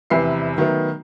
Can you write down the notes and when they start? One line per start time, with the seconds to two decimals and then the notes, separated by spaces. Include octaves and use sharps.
0.10 F1 E2 C3 B4 E5 C7
0.58 D#3 F#3 A3 B3